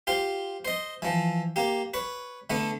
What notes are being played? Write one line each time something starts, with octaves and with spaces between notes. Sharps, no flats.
F4 G4 C5
C5 D#5
E3 F3
A#3 G4
B4 C#5
D3 A3 B3 D4